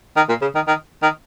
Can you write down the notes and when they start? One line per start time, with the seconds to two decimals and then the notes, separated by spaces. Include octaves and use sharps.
0.16 D#3
0.29 A#2
0.42 C#3
0.55 D#3
0.68 D#3
1.02 D#3